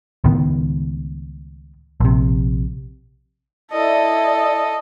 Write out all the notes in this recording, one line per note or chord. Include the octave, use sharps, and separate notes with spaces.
C#2 A2 D#3 B3
A#1 C3
E4 A4 D5 D#5